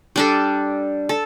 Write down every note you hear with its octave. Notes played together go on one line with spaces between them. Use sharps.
G3 D4 A4
A4